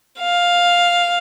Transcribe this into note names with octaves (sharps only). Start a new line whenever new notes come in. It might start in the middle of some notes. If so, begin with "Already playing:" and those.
F5